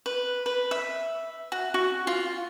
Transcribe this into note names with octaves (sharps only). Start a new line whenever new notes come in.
B4
B4
E5
F#4
F#4
F4